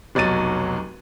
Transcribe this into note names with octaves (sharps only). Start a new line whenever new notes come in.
F1 B1 F#3 A6 D#7